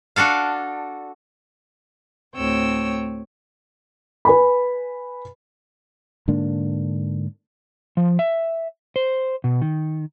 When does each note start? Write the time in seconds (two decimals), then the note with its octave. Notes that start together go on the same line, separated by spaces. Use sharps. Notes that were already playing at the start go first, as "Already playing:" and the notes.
0.16 D4 F#4 A4 F5
2.34 D2 A2 C4 C#5 G5 E6
4.25 B4 G#5 B5
6.28 G#2 D3 A#3 D4
7.97 F3
8.19 E5
8.96 C5
9.44 B2
9.62 D#3